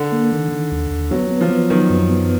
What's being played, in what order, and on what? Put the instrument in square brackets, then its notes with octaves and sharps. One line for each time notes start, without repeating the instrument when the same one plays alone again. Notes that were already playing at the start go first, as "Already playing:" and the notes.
Already playing: [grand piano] D3
[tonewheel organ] A#3
D#3
D#3
D#2
D#2
[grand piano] F#3 [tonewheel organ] B3
[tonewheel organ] B3
[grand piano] F3
[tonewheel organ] B3
[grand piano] D#3 [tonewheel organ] F#3
[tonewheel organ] F#2
B3